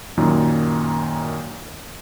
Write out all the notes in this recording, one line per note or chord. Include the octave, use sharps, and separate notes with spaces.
F#2 A#2 D#3